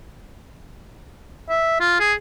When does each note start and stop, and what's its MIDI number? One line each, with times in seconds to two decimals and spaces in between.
1.50 1.76 76
1.80 1.97 65
2.00 2.14 68